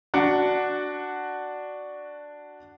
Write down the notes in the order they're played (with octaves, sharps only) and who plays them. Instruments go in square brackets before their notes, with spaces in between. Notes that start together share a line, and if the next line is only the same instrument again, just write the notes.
[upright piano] D4 F#4 F#5